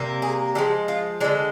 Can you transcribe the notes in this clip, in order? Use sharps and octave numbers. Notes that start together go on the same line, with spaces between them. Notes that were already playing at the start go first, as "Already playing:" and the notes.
Already playing: C3 G3 A#3
G#4
D3 F3 G#3 G4
F4
D3 G#3 D4